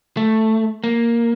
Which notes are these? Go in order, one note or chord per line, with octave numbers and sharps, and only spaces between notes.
A3
A#3